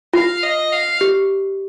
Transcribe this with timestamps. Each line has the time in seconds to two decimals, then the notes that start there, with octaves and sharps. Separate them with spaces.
0.14 F4 F5
0.43 D#5
0.72 F5
1.01 G4